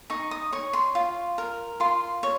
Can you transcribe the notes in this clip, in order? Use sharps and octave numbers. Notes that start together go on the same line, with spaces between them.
D#4 C#6
D#6
C#5 C#6
C6
F4
A#4
F4 C6
C#5